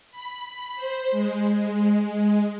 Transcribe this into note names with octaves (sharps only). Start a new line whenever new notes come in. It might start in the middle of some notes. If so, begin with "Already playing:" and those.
B5
C5
G#3
G#3